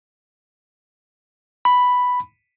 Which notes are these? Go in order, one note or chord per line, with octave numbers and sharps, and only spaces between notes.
B5